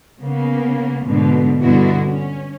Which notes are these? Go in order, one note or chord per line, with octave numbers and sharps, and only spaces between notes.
C#3 A#3 B3
G#2 B2 D3 A3
G2 B2 D3 B3 E4 F#4
C#4